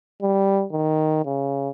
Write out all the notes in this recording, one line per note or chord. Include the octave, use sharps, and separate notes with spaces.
G3
D#3
C#3